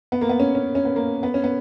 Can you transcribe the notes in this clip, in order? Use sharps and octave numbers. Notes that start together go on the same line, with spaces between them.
B3
A#3
B3
C#4
C#4
C#4
B3
A#3
B3
C#4
B3